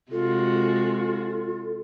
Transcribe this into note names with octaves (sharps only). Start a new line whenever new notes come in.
C3 G#3 F4 F#4 A4